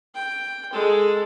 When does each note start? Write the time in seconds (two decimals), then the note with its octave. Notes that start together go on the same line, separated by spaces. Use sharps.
0.15 G5
0.72 G#3 A4